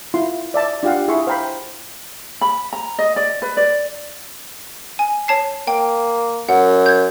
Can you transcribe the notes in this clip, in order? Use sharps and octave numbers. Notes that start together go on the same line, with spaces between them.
E4 F4 C6
D5 E5 A5
D4 F4 G4 F5 F#5
E4 G#4 E5 C6 C#6
C5 F5 G5 A#5 B5
B5
A#5
D#5
D5
B4
D5
G#5
C#5 A5 C7
A#3 G5
F#2 F#5
G6 G#6